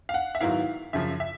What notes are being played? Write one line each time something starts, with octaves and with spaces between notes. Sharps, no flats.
F5
F#5
E5
G#2 D#3 F#3 B3 E4 F5
F#2 C#3 F3 E5
E5